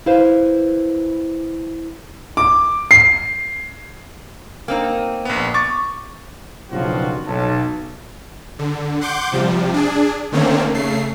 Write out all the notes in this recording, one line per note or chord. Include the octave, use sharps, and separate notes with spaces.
E4 B4 C5 F5
D6
C7
A#3 C4 D#4
A#1 B3
C#6 D6 A6
F#1 B1 G2 F3 F4 F#4
B1 A5
D3
F#5 C6 D6 G6
C3 F3 G3
D4 G#4
D3 D#3 A3 A#3 C4 C#4
C#3 A3 C7